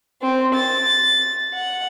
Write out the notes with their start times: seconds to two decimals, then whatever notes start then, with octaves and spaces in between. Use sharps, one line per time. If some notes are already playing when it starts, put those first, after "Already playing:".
0.23 C4
0.55 A6
1.55 F#5